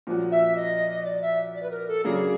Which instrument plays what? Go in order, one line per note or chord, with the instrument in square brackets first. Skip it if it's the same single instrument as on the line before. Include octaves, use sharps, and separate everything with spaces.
[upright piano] A#2 F3 A#3 C#4 F#4
[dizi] E5
D#5
D#5
D5
E5
D5
B4
A#4
A4
[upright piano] F#2 C#3 F#3 A#3 D4 [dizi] G#4